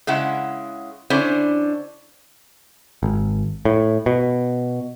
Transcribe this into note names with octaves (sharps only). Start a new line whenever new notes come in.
C#3 G#3 E4 F#5
D3 C#4 E4 C5 D5
G#1
A2
B2